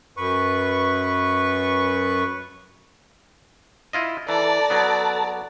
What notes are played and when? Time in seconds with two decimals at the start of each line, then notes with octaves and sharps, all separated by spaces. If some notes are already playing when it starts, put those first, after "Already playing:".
0.17 F#2 B4 C#6
3.93 E4 F4 D#5
4.29 E3 A4 D5 A5 A#5
4.70 F#3 B3